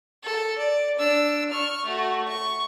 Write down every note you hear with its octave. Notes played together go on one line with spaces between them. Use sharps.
A4
D5
D4 E6
C#6 F6
A3 F#4
C#6